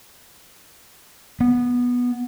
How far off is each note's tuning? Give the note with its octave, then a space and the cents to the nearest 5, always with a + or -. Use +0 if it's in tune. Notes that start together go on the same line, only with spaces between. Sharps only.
B3 -10